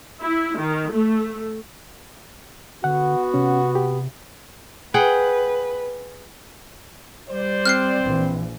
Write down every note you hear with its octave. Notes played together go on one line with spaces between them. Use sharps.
E4
D#3
A3
D3 B3 F#4 F#5
C3 C#4
G4
G#4 B4 F#5 G5
G3 C5 D5
C4 F6 F#6 C7
A#1 E3